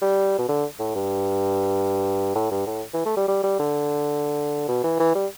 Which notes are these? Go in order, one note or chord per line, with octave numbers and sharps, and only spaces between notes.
G3
B2
D3
A2
G2
A2
G2
A2
E3
A3
G3
G3
G3
D3
B2
E3
E3
G3